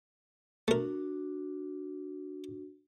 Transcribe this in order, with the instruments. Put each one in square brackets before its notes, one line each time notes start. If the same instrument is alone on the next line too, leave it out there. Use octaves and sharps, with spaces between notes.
[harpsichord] A3 A#4 [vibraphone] D4 F#4